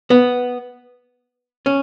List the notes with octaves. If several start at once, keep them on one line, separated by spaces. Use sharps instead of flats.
B3
C#4